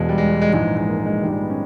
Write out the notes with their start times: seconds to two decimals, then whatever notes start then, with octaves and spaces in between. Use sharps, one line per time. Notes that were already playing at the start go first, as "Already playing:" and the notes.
Already playing: E1 E2 B2 G#3
0.09 G3
0.18 G#3
0.29 G3
0.41 G#3
0.53 A#1 G#2 E3 G#3
0.77 G#3
0.88 A#3
0.99 A#3
1.06 G#3
1.23 A#1 G#2 D#3 G3
1.32 G#3
1.41 B3
1.49 C#4